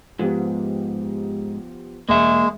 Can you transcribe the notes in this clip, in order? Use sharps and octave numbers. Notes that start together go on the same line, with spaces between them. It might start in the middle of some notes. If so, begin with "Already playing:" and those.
G#2 F3 B3 G4
E1 G#3 A#3 E5